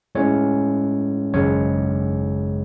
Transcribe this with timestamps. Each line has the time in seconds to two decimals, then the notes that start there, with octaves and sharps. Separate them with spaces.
0.15 A2 G#3 C#4 C#5
1.33 G#1 F#2 C#3 G#3 C#5